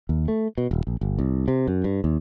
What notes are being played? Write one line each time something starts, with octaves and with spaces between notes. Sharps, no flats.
D#2
A3
B2
D#1
A#1
G1
C2
C3
F#2
G2
D#2